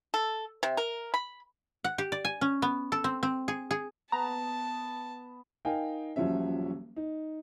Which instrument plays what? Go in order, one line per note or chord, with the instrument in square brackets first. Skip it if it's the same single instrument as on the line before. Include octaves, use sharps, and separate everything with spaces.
[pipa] A4
C3
A#4
B5
[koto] F#5
G4
D5
G#5
C#4
B3
A4
C4
C4
G#4
G#4
[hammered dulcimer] B3 [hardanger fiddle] A5 [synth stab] A#5
[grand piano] D#4 A#4 D#5 F5 G5 G#5
D#1 F3 F#3 C#4 E5
D#4